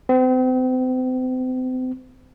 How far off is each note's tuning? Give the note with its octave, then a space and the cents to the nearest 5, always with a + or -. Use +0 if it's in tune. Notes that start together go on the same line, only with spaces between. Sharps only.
C4 -35